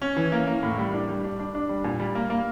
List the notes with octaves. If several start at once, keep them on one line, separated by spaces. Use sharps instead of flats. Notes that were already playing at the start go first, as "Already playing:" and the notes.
C#4
E3
A#3
A#3
A2
G3
D4
G3
D4
D4
D4
G3
A#2
G3
A#3
A#3